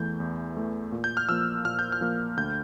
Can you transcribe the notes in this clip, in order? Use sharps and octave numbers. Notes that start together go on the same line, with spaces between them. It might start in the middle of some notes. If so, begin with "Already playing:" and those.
Already playing: E2 E3 A3 G6
E2
E3 A3
A#2
G6
F6
F3 A#3 E6
A#2 F6
G6
F6
F3 A#3
D2 G6